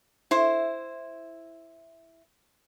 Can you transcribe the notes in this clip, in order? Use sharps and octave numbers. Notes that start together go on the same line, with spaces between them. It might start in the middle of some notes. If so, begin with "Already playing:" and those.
E4 C5